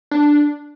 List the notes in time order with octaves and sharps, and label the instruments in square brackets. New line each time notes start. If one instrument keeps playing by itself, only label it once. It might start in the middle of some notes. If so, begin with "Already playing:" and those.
[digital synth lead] D4